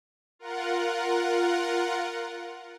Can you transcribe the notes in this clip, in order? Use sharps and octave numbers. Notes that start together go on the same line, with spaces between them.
F4 A#4 F#5